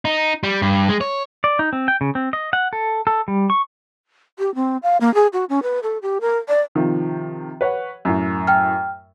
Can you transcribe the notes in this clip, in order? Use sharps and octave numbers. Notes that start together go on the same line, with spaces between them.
D#4
G3
G2
G#3
C#5
D5
D#4
C4
G5
C#3
C4
D#5
F#5
A4
A4
G3
C#6
G4
C4
F5
A#3
G#4
F#4
C#4
B4
A4
G4
A#4
D5
C3 D#3 F3
B4 C#5 F#5
F#2 A2
G5 F6